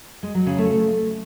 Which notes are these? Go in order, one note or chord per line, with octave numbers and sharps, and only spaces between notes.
G#3
F#3
C#3
A3